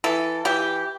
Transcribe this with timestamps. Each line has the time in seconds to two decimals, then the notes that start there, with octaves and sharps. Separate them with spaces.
0.04 E3 A4
0.45 E3 G4